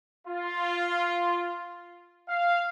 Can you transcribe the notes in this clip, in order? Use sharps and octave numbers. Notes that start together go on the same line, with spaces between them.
F4
F5